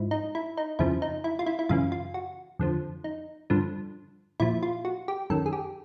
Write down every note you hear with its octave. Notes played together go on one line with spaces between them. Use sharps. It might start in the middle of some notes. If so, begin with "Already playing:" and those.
Already playing: G#2 F3 E4
D#4
E4
D#4
F2 C#3 F3 E4
D#4
E4
F4
E4
E4
F#2 C#3 E3 F4
F4
F#4
F2 D3 F3
D#4
G2 D3 F3
A#2 F3 E4
F4
F#4
G4
F#2 D#3 A4
G#4
G4